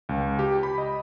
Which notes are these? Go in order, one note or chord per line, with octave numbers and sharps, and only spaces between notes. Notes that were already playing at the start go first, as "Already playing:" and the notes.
C#2
G4
B5
D#5